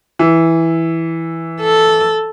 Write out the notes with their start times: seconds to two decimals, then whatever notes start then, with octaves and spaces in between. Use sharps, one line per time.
0.19 E3
1.61 A4